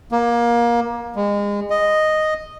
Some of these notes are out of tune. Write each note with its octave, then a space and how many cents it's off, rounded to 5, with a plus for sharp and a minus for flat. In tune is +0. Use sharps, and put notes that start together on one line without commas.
A#3 +25
G#3 -30
D#5 -5